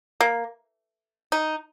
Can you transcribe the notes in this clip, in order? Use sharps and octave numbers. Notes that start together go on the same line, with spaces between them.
A#3
D#4